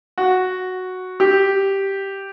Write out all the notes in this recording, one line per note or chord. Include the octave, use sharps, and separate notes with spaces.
F#4
G4